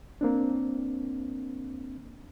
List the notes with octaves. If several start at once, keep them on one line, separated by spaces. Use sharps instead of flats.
A#3 C4 D4